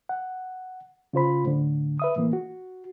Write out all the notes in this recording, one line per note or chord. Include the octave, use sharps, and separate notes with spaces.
F#5
C#3 F4 C5 B5
A2 D3
B4 E5 D#6
A2 E3 A#3
F#4